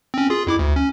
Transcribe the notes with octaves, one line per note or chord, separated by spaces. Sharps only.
C4 C#4
F4 G#4
F2 E4 D6
D2
C#4